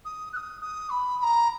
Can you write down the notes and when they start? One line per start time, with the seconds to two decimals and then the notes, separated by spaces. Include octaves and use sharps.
0.05 D#6
0.33 F#6
0.37 D#6
0.61 D#6
0.90 B5
1.18 B5
1.23 A#5